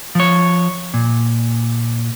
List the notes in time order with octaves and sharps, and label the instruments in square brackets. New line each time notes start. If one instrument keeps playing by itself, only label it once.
[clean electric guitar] F3 C#5
A#2